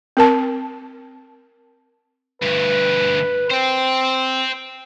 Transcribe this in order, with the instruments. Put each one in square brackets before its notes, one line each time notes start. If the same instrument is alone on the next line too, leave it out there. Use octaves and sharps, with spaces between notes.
[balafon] C4 A#4 A5
[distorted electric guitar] D2 G2 [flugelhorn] B4
[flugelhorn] C4 [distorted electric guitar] C5 G5